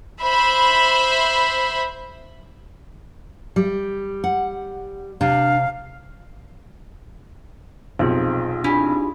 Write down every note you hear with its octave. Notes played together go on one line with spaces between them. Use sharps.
C5 E5 B5
G3
F#5
C3 D4 F5
B1 F2 C3 D#4 F4 G#4 C5
D4 E4 G4 G#5